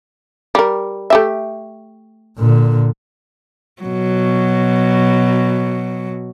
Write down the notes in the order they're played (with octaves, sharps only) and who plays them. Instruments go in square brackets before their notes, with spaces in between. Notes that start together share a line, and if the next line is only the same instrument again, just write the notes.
[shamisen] G3 A#4
A3 G4 E5
[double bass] A#2 D3
[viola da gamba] B2 F#3